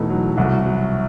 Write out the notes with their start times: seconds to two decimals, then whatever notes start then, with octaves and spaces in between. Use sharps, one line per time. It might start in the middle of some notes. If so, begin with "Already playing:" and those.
Already playing: E2 B2 A3 B3 D#4 E4
0.10 F#3
0.37 C2 F#4
0.59 F#4
0.65 F#3